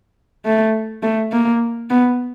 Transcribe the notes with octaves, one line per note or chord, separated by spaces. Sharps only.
A3
A3
A#3
B3